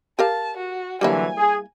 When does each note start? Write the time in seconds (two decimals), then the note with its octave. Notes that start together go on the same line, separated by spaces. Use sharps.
0.19 G4 A#4 F5 A5
0.57 F#4
1.01 D3 E3 F#3 G3 A#3 E4 G#5
1.38 G#4